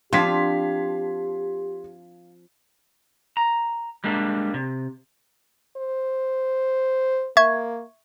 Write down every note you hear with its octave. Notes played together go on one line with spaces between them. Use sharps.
F3 C4 D4 G4 F5 C6 G#6 B6
A#5
G3 G#3 A#3 D4
C3
C5
A#3 E5 C#6 G#6